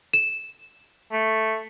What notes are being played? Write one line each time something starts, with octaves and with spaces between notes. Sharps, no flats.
E7
A3